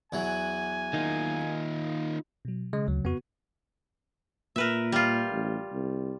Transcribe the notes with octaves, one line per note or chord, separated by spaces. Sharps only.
E2 E3 F#3 G#5
D#3 A#3 D#4 F4
B2 F#3
C#3 G#3
D2 F#3
F2 B3 F#4
A#2 A#4 B4 E5
G3 F4
A1
C2